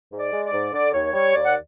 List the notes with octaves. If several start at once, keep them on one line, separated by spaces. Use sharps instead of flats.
G#2
D5
G#3
D5
G#2
D3 D5
D#2 C#5
G3 C#5
D#2 D5
F#5